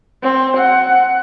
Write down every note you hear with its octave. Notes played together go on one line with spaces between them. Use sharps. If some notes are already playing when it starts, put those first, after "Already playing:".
C4
F#5